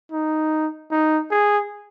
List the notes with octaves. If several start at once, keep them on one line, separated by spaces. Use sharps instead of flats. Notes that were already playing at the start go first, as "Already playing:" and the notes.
D#4
D#4
G#4